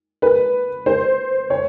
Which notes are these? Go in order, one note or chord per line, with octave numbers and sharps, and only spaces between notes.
B4
C5
C#5